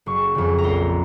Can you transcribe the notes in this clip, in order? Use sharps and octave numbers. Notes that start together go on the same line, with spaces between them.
F#1 C#6
F2 C#3
A#5
A#1 C6